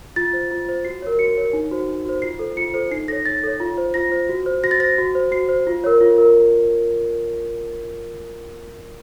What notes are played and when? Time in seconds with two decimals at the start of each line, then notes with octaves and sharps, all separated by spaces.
0.16 F4 A6
0.33 C5
0.51 F4
0.69 C5
0.85 F#4 C7
1.02 A#4 C#5
1.19 F#4 C#7
1.37 A#4 C#5
1.53 D#4
1.71 F#4 C5
1.88 D#4
2.05 F#4 C5
2.22 F4 C7
2.39 A4 C5
2.57 F4 C#7
2.74 A4 C5
2.91 D#4 C7
3.08 A4 A#6
3.12 C#5
3.25 D#4 A6
3.44 A4 C#5
3.60 F4
3.78 C5
3.94 F4 A#6
4.12 C5
4.29 F#4
4.46 C5
4.64 F#4 A#6
4.71 A6
4.80 C5 A#6
4.98 F#4
5.15 C5
5.32 F#4 C7
5.49 C5
5.67 F4
5.84 A#4 C#5
6.01 F4
6.18 A#4